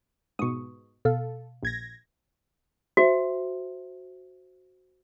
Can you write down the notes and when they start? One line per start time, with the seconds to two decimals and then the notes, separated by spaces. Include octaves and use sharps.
0.39 G#2 B2 C#6 D#6
1.05 B2 A4 F5
1.63 A#1 G#6 A#6
2.97 F#4 C5 E5